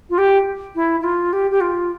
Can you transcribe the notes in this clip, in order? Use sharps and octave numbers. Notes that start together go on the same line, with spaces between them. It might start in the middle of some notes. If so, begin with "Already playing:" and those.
F4
G4
E4
E4
F4
G4
G4
F4